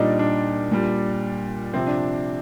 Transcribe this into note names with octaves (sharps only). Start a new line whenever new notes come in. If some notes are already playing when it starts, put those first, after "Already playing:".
Already playing: A#2 G3 D4 D#4
D4
A#2 G3
C3 F3 C4
D4